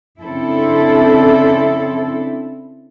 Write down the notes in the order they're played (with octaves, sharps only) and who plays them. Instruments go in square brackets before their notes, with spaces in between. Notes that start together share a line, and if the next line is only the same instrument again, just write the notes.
[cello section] C#3 C4 D4 E4 A4